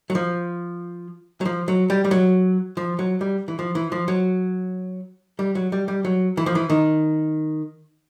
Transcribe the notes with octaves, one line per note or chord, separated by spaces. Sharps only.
F#3
F3
F#3
F3
F#3
G3
G3
F#3
F3
F#3
G3
E3
F3
E3
F3
F#3
G3
F#3
G3
G3
F#3
E3
F3
E3
D#3